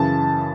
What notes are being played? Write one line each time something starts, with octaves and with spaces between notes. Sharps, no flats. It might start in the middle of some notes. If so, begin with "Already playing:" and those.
Already playing: F#2 C#3 E3 A5